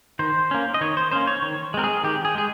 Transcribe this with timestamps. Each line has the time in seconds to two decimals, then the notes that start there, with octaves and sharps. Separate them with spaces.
0.19 D#3 C5
0.51 A#3 C#4
0.74 D#5
0.81 D#3 C#5
0.97 C5
1.11 A#3 C#4 C5
1.27 C#5
1.42 D#3 C#5
1.74 G#3 C4 A#4
1.84 G#4
2.04 D#3 G4
2.25 G#4
2.35 G#3 G#4